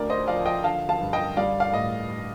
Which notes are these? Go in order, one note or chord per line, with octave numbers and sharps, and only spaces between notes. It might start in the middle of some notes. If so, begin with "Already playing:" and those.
Already playing: D2 A#4 D5
C5 D#5
F3 D5 F5
D#5 G5
D3 F5 A5
F5 A5
G2
D#5 G5
G3 D5 F5
D5 F5
A2 D#5